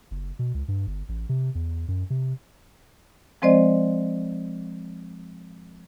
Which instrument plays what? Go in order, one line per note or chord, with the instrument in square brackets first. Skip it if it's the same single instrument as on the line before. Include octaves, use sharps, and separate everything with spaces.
[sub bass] F#1
B2
C#2
G2
G1
A1
C3
E2
F#2
C3
[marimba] F3 G#3 C4 C5 D5 D#5